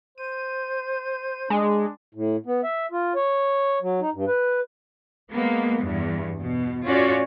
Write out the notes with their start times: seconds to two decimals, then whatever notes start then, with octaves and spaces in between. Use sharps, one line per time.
0.18 C5 D#7
1.50 G#3 D4
2.14 A2
2.46 B3
2.64 E5
2.92 F4
3.15 C#5
3.82 F#3
4.01 D#4
4.14 G2
4.27 B4
5.31 G#3 A#3 B3
5.81 E2 G2
6.40 B2
6.85 A2 C#4 F4 F#4 C#5 D5